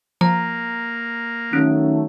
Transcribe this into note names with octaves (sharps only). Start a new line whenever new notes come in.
F3 A#3 A#5
D#3 F#3 A3 C#4